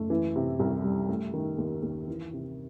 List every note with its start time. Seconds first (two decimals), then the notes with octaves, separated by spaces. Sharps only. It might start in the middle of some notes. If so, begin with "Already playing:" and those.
Already playing: F#1 A3
0.10 E3
0.36 C3
0.59 C2
0.84 G3
1.08 A3
1.34 D#3
1.58 D#2
1.83 D#2
2.08 E3
2.33 C3